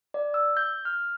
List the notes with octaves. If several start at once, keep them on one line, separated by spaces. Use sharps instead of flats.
D5
E6
G6
F6